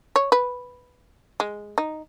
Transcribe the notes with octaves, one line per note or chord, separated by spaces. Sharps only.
C#5
B4
G#3
D#4